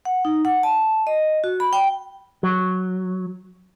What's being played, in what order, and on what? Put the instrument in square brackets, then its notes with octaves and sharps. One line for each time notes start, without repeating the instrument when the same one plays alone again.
[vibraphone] F#5
D#4
F#5
A5
D#5
F#4
B5
G5
[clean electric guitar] F#3